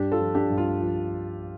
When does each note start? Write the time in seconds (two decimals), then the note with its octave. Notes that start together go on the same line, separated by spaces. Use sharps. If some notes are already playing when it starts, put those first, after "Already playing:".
Already playing: G2 D4 G4
0.12 F4 A4
0.19 F3
0.35 D4 G4
0.50 G2
0.58 F4
0.81 F3